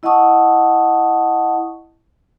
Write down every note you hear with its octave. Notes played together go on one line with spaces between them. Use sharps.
E4 D#5 F#5 A5 C#6 D#6